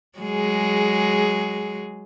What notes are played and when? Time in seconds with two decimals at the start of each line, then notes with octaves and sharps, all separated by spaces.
0.19 F#3 G#3 G#4